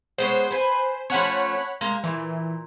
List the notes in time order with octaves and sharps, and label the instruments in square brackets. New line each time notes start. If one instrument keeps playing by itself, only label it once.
[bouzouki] G#3 B3 C#5 [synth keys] C5
[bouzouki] B4 G#5
[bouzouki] F3 A3 C#4 [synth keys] C#5 F#5 B5
[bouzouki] G#3 A#3 A#4
[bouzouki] A#2 [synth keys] E3